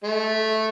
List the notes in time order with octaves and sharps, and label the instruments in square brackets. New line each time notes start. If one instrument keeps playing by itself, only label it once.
[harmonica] A3